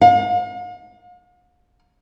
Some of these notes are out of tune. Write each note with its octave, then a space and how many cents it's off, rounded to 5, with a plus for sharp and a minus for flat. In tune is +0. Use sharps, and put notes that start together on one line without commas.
F5 +45